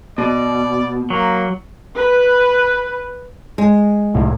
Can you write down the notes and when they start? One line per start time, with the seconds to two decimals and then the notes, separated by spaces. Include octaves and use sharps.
0.18 B2 D5
1.10 F#3 A#3
1.96 B4
3.58 G#3
4.14 C2 A2